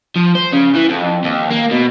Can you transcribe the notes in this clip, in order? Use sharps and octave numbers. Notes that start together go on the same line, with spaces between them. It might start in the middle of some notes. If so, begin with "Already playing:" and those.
F3
C5
C#3
E3
F2
D#2
A#3
B2